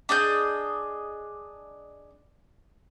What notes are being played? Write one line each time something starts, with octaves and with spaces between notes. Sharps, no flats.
D4 G#4 D#5 G6